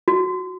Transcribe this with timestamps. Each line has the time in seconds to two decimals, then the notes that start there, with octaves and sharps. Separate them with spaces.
0.08 F#4